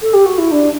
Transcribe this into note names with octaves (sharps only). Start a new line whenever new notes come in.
A4
G4
F#4
E4
D4